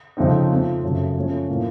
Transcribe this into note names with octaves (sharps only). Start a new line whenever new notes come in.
F2 C#3 A3 C4 D#4
F3 A3 C4 F4
F#2 C#3 A3
F3 A3 C#4
A2 F3 A#3